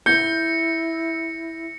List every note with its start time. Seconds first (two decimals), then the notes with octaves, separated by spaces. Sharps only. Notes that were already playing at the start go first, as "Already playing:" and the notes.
0.06 E4 G6 A#6 C#7